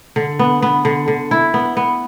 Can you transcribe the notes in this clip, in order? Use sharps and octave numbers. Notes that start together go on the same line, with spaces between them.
D3
B3
B3
D3
D3
E4
B3
B3